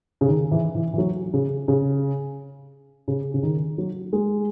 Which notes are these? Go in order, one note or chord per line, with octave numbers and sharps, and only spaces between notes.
C#3
D#3
E3
E3
E3
F#3
C#3
C#3
C#3
C#3
D#3
F#3
G#3